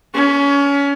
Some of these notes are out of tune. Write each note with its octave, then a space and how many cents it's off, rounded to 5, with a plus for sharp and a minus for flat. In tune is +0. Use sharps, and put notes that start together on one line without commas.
C#4 +25